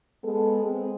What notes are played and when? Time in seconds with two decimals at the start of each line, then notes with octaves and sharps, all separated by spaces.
0.23 G#3 B3 A4
0.62 G#3 B3 C4